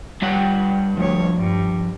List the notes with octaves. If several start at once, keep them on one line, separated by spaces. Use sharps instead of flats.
G2 G3 C#5 F#5
D2 F3 C#5
G2